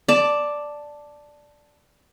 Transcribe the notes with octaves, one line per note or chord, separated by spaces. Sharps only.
D5 A5